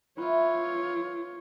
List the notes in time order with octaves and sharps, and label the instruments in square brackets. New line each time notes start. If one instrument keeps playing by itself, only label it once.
[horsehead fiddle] F4 C#5 [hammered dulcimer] B4 E5